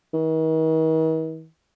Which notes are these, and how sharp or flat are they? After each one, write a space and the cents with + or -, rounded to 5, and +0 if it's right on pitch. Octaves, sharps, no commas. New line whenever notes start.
D#3 +45